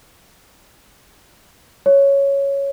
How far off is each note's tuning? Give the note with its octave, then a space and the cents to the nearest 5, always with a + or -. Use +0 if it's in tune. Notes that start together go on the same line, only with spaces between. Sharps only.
C#5 +0